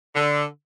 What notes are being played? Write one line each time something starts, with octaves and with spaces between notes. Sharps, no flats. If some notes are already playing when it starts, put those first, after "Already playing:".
D3